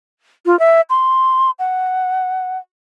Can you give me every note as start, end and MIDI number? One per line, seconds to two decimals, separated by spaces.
0.46 0.58 65
0.59 0.81 76
0.90 1.51 84
1.59 2.58 78